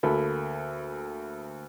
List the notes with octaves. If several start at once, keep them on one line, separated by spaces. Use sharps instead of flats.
D2 A#3 A4 B5